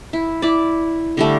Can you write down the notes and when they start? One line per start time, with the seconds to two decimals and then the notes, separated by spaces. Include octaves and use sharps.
0.13 E4
0.42 E4 D5
1.17 D3 G3 A3